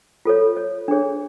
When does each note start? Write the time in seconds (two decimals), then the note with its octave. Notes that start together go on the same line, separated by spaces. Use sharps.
0.25 F4 A4 C#5
0.57 C#5
0.88 D4 G#4 C#5